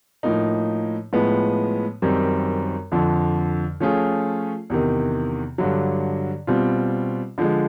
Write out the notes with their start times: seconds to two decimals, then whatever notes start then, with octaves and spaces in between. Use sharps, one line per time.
0.23 A2 F3 A#3 D#4
1.13 A2 F3 G#3 B3
2.02 F#2 D#3 G3 C4
2.92 F2 D3 F3
3.80 F3 A3 C#4 F4 G#4
4.70 E2 C3 D#3
5.58 G2 D3 F#3
6.47 B2 G3 C4 F4
7.38 D3 F3 G#3